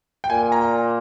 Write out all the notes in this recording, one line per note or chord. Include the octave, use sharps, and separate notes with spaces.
G5
A#2 G#5
A#5